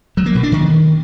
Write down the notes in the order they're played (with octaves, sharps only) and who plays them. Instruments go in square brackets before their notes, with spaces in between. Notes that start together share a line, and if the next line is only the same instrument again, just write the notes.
[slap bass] F#3
A#3
B2
D4
D#3